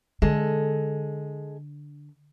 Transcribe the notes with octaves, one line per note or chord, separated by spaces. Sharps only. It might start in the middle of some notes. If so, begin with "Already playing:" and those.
D3 G#3 A4